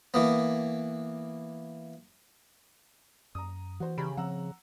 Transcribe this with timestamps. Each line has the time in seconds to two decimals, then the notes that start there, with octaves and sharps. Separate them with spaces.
0.14 E3 A#3 B3
3.35 F#2 A#5 D#6
3.80 E3 F#4 C5
3.98 C#3 G4 A#5 B5
4.17 F3 C4 F#5 A#5 E6